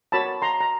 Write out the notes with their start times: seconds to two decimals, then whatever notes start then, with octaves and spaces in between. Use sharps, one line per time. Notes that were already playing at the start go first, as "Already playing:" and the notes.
0.12 F#4 A#4 C#5 A5 B5
0.42 A#5 C6
0.61 A#5